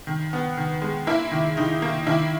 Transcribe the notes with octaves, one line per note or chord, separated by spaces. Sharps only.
D#3
B3
D#3
G#3
A#3 E4
D#3
D#3 D#4
A#3
D#3 E4